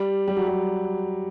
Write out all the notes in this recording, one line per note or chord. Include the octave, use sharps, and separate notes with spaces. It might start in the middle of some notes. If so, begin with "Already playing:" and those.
Already playing: G3
G3
F#3
G3